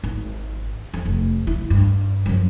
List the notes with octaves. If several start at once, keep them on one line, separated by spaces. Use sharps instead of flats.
G#1
F2
F1
E4
G2
F#2 F3